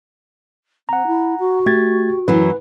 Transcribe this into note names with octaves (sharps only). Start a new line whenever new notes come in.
C4 F#5 A#5
E4
F#4
A3 G4 G#6 A6
F#2 E3 F#3 B4